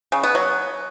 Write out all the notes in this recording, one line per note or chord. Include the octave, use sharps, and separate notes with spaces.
C#3
B3
F#3